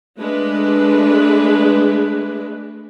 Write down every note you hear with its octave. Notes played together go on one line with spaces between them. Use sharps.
G#3 A3 D4 B4